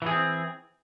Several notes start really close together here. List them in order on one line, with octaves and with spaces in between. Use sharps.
E3 G#4 C4